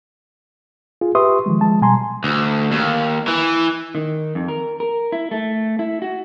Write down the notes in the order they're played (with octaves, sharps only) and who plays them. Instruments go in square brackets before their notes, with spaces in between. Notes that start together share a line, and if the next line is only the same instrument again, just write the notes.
[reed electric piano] F4 G#4
G4 B4 E5 C6 C#6 D#6
D#3 F3 G#3
F3 G#3 A5
B2 G3 G#5 A#5 C6
[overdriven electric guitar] D2
D#2
E3
[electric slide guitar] D#3
F2
A#4
A#4
E4
A3
E4
F#4